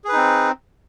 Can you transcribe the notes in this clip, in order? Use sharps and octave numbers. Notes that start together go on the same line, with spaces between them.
C4 D#4 G#4 B4